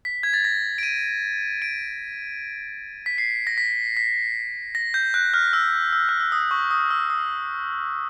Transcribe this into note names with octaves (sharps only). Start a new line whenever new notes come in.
B6
G#6
A6
A#6
D7
D#7
D7
B6
C7
A#6
B6
B6
A#6
G6
F#6
F6
E6
E6
F6
E6
D#6
C#6
D#6
E6
D#6